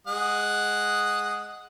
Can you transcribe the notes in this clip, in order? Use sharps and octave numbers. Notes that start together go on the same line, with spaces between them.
G#3 F#5 D#6